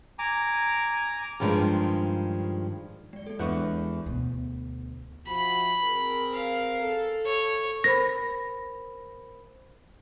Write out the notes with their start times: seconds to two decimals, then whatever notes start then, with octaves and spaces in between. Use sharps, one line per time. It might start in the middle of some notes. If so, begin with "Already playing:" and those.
0.19 G#5 A#5 D6
1.40 G2 D#3 F3 G#3 D4
3.13 G#3 D5
3.26 A#3 A4
3.39 E2 G#3 D4 E5 F#5 C#6
4.06 D2 B2
5.27 F3 E4 F#4 B5
5.83 C4 G#4 A#4
6.33 F5
6.81 A4
7.25 C#5
7.84 A#4 C5 B5 A#6